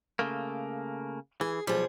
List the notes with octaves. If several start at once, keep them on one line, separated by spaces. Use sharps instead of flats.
C#3 A3 A#3
E3 G#4
B1 F3 G3 G#4